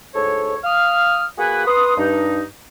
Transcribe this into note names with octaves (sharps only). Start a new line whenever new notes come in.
D2 G#2 A4 C#5
F5 D#6 F6
A#3 F#4 G#4 B4 F#5 G#5
B4 C6 D#6
G2 D#4